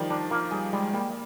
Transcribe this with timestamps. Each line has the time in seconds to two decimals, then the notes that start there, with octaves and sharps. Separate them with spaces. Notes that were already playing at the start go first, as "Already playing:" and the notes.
Already playing: D#3 F3 G3
0.10 D#3 D4
0.31 F3 A#3
0.51 G3 G#4
0.73 G3 G#3
0.93 G3 A#3